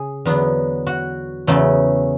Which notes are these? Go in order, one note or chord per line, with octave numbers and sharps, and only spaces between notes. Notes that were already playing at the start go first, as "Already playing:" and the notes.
Already playing: C#3 G#4
E2 D3 F#3 B3 D4
F#4
E2 C#3 F#3 A3